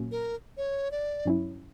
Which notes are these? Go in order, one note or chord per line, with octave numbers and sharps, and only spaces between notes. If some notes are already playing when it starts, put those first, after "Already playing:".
Already playing: A#2 F#3 A#3 C#4
A#4
C#5
D5
G2 F#3 C#4 E4